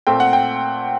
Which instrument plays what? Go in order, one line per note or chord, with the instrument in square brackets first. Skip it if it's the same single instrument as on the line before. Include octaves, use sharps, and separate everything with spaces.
[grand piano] A#2 A3 C4 G5
F#5
G5